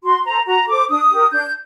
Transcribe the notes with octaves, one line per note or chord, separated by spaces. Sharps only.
F#4 C6
A4 C5 A#5
F#4 A#5
A4 C5 D6
D4 D#6
G4 A#4
D4 G6